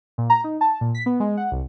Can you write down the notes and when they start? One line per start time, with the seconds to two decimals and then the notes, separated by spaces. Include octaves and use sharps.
0.18 A#2
0.30 A#5
0.44 D#4
0.61 A5
0.81 A#2
0.95 B6
1.06 B3
1.20 G#3
1.37 F#5
1.52 C2